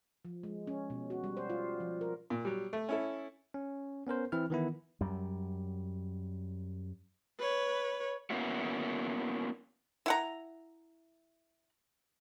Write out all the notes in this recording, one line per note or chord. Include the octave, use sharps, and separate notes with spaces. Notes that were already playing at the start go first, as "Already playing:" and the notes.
F3
G#3
C#4
B2
F#4
G3
C5
F4
F3
A#4
A#2
F#3 G3
A3
C#4 E4 A4
C#4
B3 C#4 A#4 C5
E3 C4 E4 F6
D#3 E3 B3 E4
F#2 G3
B4 C#5
A#3 B3 C#4 E4 F#4
E4 F#5 A#5